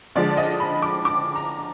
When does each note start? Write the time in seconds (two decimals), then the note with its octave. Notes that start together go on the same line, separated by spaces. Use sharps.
0.16 D3 F3 G#3 D5
0.37 D#5
0.60 B5
0.82 D6
1.05 D6
1.36 A#5